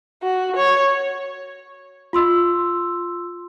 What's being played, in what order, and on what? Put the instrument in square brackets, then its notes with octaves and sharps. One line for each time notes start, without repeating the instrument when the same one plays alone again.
[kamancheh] F#4
C#5
[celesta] F4 C6 E6